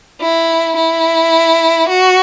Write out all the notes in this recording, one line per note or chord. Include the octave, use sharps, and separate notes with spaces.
E4
E4
F#4